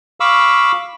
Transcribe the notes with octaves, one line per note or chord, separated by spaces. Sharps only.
F5 B5 C#6 D6 E6